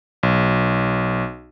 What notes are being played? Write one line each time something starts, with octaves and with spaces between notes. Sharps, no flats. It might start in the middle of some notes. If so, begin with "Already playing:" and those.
B1